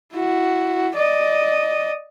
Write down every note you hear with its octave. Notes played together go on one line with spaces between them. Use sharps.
E4 F#4
D5 D#5